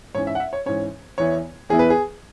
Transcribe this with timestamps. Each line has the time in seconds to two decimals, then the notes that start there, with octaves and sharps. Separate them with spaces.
0.15 G#2 E3 C#4 C#5
0.27 E5
0.35 F#5
0.40 E5
0.53 C#5
0.66 G#2 E3 C#4 C#5
1.18 E2 E3 B3 E4 C#5
1.69 E2 E3 B3 E4 G#4
1.79 B4
1.90 G#4